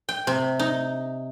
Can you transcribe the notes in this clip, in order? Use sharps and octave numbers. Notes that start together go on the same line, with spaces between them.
G5
C3
D#4